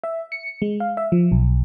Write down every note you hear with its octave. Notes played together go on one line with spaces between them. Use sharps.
E5
C#7
G#3
F5
E5
F3
B1